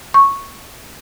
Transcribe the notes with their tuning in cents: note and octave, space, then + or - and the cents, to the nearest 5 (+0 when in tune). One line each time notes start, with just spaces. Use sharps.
C#6 -5